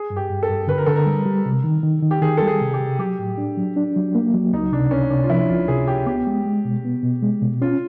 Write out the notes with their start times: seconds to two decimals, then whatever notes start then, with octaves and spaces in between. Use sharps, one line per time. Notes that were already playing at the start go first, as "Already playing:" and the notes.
Already playing: G#4
0.10 G2
0.16 G4
0.30 G2
0.43 A4
0.49 G2
0.67 D3 B4
0.78 A#4
0.86 D3 A4
0.96 A#4
1.06 G3
1.26 G3
1.46 C3
1.64 D#3
1.83 D#3
2.02 D#3
2.11 G4
2.21 D#3 G#4
2.37 G3 A4
2.47 G#4
2.61 C3
2.74 G4
2.80 C3
2.99 F#3 G4
3.19 A2
3.38 D4
3.57 F#3
3.76 D4
3.96 F#3
4.15 A#3
4.34 F#3
4.53 C#2 D#4
4.73 C3 D4
4.91 C#2 C#4
5.10 C3 D4
5.23 F4
5.30 F3 E4
5.49 C#2 F4
5.68 C3 G#4
5.87 C#2 G4
6.07 B3 G4
6.27 G#3
6.45 G#3
6.65 B2
6.85 B3
7.03 B2
7.23 G#3
7.42 B2
7.62 C#4 F4